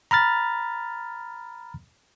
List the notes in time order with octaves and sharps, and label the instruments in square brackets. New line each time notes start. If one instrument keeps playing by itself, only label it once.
[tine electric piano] A#5 B5 F6 A6